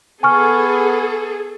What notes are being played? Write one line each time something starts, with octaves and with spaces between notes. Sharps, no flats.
B3 G#4 A4 G#5 C#6 F6